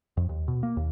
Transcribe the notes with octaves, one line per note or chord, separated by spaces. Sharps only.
F2
D#2
B2
A#3
D#2